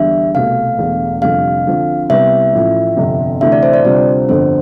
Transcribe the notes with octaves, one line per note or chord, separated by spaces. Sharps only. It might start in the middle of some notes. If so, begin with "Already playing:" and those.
Already playing: E2 D3 G3 D4 E5
C2 B2 A3 F5
E1 E2 D3 A3
F1 F2 D3 G3 F5
D2 D3 F3 C4
C2 C3 G3 B3 E4 E5
A1 A2 F3
G1 F2 C3
D2 C3 E3 A3 E5
D5
C5
D5
D2 C3 G3 D4 F4 C5
G1 F2 D3 C5